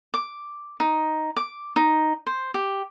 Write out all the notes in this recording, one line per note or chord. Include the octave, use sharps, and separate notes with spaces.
D6
D#4
D6
D#4
C5
G4